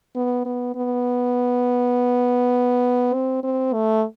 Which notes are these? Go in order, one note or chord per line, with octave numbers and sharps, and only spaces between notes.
B3
B3
B3
C4
C4
A3